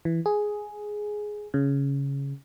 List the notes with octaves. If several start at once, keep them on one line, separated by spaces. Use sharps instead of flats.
E3
G#4
C#3